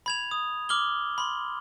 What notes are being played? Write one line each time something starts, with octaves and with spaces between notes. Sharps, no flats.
B5 G#6 F7
D#6
D6 F6 F#7 G7
B5 C6